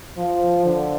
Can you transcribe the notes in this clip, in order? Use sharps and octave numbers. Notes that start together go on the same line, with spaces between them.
F3
D3